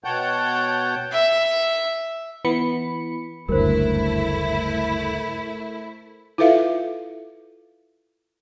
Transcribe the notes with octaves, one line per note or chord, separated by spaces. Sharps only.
B2 C#5 F#5 G5 A5 G6
E5
E3 B3 B5 C#7
F#1 D2 G2 A3 E4 A#4 C5
E4 F4 A4 B4 E5 F5